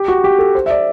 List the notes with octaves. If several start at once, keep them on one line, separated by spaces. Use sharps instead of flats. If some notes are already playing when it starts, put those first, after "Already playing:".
Already playing: G4
F#4
G4
A4
C5
E5
D5